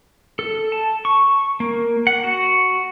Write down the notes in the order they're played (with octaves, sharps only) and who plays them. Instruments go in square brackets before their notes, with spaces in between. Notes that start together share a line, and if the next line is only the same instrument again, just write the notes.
[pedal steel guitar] A4
A5
C#6
A#3
F#5
F#4